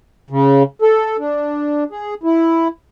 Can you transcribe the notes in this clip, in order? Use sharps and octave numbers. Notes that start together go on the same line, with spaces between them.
C#3
A4
D4
G#4
E4